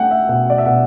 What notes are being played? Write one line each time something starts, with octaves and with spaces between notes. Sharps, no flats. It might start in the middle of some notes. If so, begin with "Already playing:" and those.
Already playing: A3 D4 F#5 G5
E5
B2 F#5
D5
E5
B2 F#5